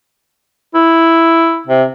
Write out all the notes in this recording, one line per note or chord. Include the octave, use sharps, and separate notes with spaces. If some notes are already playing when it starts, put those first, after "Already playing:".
E4
C3